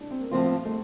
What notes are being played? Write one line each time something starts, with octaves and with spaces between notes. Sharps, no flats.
D4
C4
A#3
A2 F3 A3 C4 F4
A3